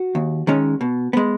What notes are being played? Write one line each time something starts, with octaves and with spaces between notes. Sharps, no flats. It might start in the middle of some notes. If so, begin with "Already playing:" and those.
Already playing: F#4
D#2
D#3 G#3 C#4
B2
G#3 B3